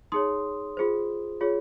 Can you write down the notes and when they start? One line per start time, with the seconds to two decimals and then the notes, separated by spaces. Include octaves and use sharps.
0.12 D#4 G#4 C#5 C6 D#6
0.77 F4 G#4 C5
1.41 F4 G#4 C#5